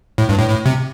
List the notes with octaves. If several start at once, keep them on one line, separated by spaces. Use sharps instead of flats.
A2
G2
A2
A2
C3